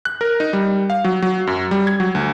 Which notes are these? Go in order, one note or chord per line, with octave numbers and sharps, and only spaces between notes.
F#6
A#4
D#4
G3
F5
F#3
F#3
F#2
G3
G#6
F#3
D2